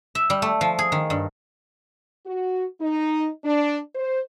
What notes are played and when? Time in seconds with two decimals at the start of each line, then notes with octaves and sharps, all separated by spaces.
0.15 E5
0.30 G3
0.42 A3
0.61 F3
0.79 G#4
0.92 D#3
1.10 G2
2.26 F#4
2.80 D#4
3.44 D4
3.95 C5